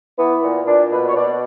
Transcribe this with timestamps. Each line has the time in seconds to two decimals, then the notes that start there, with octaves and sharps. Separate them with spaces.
0.17 E3 B3
0.41 A#2 B3
0.66 A#2 D4
0.90 B2 B4
1.07 C#5
1.15 B2 D5